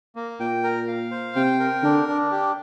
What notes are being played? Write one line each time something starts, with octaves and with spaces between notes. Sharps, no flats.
A#3
A#2 G5
A#4
F5
C5
C3 G5
A#4
D3 D4
D4
G4